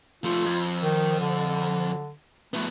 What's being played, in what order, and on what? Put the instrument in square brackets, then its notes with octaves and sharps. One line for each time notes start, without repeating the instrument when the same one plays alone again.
[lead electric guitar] F3 A3 [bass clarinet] F4
[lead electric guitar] F2
[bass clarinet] D#3
D3
[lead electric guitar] F3 B3 [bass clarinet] A3